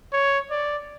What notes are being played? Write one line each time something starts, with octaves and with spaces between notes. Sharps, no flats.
C#5
D5